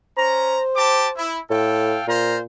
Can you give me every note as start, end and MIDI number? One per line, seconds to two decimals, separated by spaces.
0.17 0.60 61
0.17 1.24 72
0.17 0.60 82
0.76 1.08 67
0.76 1.08 81
0.76 1.08 86
1.16 1.39 64
1.50 1.99 45
1.50 2.04 69
1.50 2.04 77
1.50 2.04 79
2.08 2.44 46
2.08 2.37 65
2.08 2.37 72
2.08 2.37 82